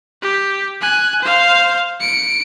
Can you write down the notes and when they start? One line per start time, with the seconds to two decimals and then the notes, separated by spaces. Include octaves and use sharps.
0.22 G4
0.81 G#5 F#6
1.22 C5 F5
2.01 C#7 D7